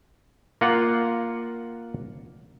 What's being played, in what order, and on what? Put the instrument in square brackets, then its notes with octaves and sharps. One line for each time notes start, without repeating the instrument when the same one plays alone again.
[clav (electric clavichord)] A#3 F4 D5 F#5